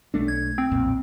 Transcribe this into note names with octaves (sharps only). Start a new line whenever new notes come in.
B1 A3 D4
G#6
C4
B1 F2 A#2